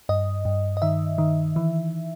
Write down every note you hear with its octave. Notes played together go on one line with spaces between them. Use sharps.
G2 D#5
G2
D#5
D#3 E5
D#3
E3